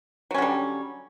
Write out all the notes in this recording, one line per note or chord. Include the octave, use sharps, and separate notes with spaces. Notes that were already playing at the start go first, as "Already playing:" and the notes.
D3 F#3 G3 C#4